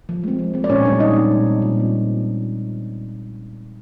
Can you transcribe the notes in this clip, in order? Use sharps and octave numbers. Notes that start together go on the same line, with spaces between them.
F3
G#3 C4
F3
G#3 C4
D5
A#2 C#4 C#5
G3 C4 D4 D5
A#2 D#4 D#5
G3 C4
A#2
G3 C4
A#2
G3 C4